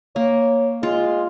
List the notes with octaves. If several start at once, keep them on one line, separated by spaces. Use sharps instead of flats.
A#3 C#5
G#3 F4